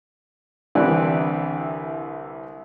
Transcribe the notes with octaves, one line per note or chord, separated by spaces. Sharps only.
C2 D3 E3 G4 D5 F#6